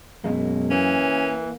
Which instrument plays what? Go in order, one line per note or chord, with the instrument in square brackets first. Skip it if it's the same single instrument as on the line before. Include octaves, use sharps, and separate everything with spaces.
[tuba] F#2 [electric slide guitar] B2 G#3 A#3
[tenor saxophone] E3 [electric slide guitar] A#3 [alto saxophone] C#4